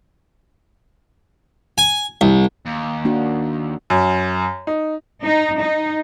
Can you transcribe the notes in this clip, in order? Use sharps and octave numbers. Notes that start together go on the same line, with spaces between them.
G#5
C2
D#2
A#3 D4 F#4
F#2
D#4
D#4
D#4